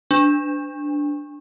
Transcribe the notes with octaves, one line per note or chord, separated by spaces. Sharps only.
D4